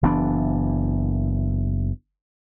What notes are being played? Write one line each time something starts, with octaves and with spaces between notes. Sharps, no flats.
F#1 E3 B3 D4